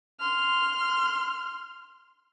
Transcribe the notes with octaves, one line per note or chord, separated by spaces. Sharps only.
C6 F6